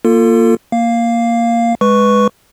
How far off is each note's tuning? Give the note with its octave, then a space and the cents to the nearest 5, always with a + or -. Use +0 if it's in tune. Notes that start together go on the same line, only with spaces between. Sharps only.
A#3 +0 F4 +0 A4 +30
A#3 +0 F5 +0
G#3 +0 B4 +0 C#6 +0